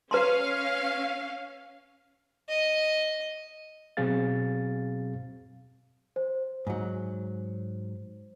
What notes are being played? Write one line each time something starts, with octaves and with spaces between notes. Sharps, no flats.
C#4 B4 F5 A#5 C6
D#5
B2 F#3 C4 G#4 F5 A6
C5
G#2 F#3